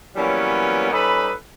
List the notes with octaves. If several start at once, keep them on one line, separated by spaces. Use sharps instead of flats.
E3 F#3 G3 A#3 B3 C#4
G3 C#4 D#4 A4 B4 B5